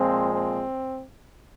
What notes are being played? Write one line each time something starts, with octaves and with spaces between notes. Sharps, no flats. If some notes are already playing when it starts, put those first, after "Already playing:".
Already playing: A#2 F3 G#3 C4
C4